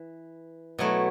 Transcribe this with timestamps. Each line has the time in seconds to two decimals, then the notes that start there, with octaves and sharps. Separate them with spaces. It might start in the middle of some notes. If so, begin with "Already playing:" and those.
Already playing: E3
0.79 B2 F#3 A3 E4